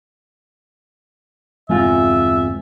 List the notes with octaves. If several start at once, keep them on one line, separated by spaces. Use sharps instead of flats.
G1 E2 C3 G#3 F4 E5